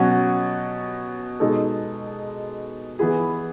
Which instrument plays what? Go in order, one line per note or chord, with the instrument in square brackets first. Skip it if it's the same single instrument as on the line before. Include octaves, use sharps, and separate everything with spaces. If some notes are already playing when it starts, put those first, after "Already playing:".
Already playing: [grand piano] B2 F#3 C#4 F#4
B2 G#3 D#4 A4
E3 B3 E4 G#4